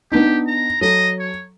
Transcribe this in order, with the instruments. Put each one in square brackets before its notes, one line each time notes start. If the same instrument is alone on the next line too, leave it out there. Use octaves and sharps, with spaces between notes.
[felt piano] B3 D4 D#4 [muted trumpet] G4
[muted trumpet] A#5
[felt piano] F#3 A4 [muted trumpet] D#5
[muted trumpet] C#5